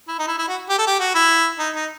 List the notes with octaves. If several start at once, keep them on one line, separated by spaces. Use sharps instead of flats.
E4
D#4
E4
E4
F#4
G4
A4
G4
F#4
E4
D#4
D#4